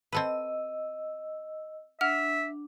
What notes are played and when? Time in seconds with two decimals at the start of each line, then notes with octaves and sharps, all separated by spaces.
0.13 C4 A4 B4 D#5 E6
2.01 D4 E5 F#5 F6